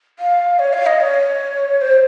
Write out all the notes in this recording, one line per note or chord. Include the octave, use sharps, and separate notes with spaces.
F5
C#5
F5
D#5
C#5
C5